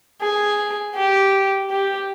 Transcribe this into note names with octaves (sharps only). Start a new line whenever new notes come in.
G#4
G4
G4